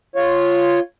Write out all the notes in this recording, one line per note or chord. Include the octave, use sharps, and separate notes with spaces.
F4 C#5